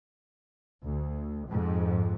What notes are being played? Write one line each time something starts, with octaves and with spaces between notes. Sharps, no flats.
D2
F2 G#2